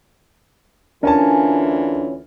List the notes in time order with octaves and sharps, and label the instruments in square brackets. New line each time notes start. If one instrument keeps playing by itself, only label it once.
[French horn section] D2 E3 F4 [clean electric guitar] C#4 [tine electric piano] D4 [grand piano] A#4 G#5 A5